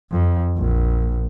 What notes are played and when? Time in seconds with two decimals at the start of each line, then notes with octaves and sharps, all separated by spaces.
0.12 F2
0.57 A#1